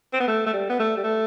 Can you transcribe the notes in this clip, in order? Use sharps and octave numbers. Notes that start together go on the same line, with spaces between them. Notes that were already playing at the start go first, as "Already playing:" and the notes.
C4
B3
A3
A3
G3
B3
A3
G3
A3